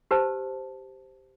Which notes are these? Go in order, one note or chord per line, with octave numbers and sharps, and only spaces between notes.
G4 B4 C5 A5